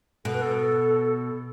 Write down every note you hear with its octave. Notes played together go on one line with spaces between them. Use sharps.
B2 A4
B4
A4